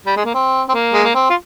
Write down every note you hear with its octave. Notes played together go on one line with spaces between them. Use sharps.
G3
G#3
A#3
C4
C4
A#3
G#3
A#3
C4
F4